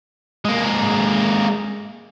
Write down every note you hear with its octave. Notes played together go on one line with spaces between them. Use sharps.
G#3 A#3